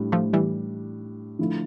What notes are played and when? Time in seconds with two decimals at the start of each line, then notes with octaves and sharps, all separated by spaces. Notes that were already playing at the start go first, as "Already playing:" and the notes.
Already playing: A2 G3 D4
0.12 F3 A3
0.33 E3 G3
1.39 D3 F3 A3 E4